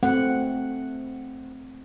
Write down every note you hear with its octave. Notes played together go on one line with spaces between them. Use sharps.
A3 C4 F#5